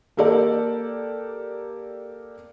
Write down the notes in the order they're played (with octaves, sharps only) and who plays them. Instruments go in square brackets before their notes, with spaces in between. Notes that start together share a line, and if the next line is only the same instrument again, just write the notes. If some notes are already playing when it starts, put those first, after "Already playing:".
[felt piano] A#3 G4 A4 A#4 D5